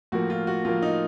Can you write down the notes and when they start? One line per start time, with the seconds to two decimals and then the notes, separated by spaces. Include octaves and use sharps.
0.12 A2 F3 A#3 F#4
0.30 F4
0.47 F#4
0.65 A2 F3 A#3 F4
0.82 D#4